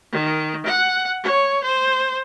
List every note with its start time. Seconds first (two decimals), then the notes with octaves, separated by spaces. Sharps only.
0.12 D#3
0.66 F#5
1.23 C#5
1.64 C5